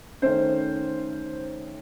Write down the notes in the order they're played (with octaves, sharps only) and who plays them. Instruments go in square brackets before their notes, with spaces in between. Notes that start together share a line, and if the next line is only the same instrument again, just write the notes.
[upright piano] D#3 A3 C#4 C5